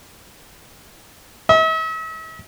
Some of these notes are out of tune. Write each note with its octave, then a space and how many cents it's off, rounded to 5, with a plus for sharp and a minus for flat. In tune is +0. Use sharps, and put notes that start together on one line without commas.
E5 -45